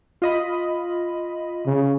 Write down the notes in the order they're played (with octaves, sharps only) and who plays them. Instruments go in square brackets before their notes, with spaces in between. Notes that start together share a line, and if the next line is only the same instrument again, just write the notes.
[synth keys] F4 D#5 B5
[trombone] C#3